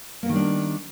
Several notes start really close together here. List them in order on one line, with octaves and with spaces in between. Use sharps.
A#3 B3 D#3 G3 D4